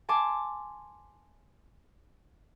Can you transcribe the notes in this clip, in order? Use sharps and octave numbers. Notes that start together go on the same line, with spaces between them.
G#5 A5 C6 D6